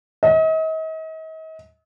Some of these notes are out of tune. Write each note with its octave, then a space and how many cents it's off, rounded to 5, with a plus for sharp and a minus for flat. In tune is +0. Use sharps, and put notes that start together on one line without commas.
D#5 +40